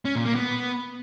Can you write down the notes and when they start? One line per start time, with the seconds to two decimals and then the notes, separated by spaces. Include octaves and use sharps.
0.05 C#4
0.15 A#2
0.25 A#3
0.36 B3